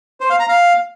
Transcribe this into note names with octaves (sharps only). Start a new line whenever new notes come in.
C5
F5
A#5
F5